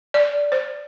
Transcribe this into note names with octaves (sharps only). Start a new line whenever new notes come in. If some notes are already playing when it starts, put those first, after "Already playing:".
D5
C5